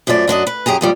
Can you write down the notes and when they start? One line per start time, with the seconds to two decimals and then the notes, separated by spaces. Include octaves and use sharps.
0.07 F#2 F3 A3 G#4 D5
0.28 F#2 D4 F#4 D#5
0.47 B4
0.66 F#2 G4 G#4 A#5
0.81 D#2 F3 G3